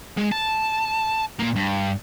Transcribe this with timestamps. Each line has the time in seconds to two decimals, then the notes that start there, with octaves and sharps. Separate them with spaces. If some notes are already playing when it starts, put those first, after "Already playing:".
0.17 G#3
0.32 A5
1.39 A#2 A#3
1.56 G2